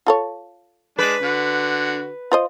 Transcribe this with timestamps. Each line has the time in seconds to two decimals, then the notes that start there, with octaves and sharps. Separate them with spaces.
0.06 F4 A4 C#5
0.99 G#3 D4 B4
1.22 D3 F#4
2.32 F4 C5 D#5